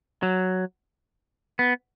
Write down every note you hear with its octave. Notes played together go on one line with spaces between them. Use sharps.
F#3
B3